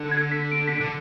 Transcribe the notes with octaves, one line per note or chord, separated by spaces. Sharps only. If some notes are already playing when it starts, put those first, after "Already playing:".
Already playing: D3
G#6
B6
D7
B6
D7
D3